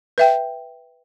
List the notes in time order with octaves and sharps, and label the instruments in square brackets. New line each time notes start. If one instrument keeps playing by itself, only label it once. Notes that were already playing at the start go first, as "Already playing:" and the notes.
[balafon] B4 E5 G5